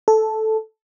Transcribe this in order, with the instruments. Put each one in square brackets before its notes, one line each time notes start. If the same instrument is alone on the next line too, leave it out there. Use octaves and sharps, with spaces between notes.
[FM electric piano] A4